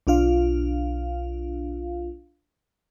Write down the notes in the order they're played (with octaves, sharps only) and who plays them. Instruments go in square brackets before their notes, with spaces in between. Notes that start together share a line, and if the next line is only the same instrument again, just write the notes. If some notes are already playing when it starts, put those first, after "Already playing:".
[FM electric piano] B1 D4 F4 F5